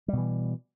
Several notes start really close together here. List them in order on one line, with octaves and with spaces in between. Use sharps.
G3 B2 E3